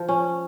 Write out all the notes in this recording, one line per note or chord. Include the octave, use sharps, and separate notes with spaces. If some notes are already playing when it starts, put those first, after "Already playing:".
Already playing: F3
C#4